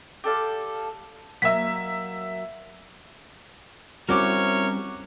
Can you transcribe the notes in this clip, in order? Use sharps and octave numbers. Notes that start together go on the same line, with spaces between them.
G4 A4 D5 F5
F#3 A#3 D#5 E5 B6
G3 C4 C#4 E4 F#4 A#4 C#5 D6